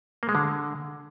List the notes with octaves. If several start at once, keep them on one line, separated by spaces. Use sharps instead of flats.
A#3
G#3
D3